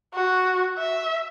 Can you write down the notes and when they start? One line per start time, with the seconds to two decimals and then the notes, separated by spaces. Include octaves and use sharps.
0.14 F#4
0.78 E5